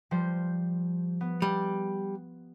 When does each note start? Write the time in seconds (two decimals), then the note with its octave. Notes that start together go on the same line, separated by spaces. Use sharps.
0.11 F3 G3 C5
1.21 B3
1.42 G3